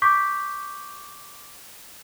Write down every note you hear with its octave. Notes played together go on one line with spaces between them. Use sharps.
C#6 D6 G6 B6